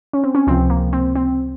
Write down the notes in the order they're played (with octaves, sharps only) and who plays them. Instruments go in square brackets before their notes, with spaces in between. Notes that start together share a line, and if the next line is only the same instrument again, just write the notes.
[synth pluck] C#4
C4
C#4
C#2 C3 F3 C4
A#3
C4
C4